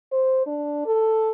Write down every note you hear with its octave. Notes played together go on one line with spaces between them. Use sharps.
C5
D4
A4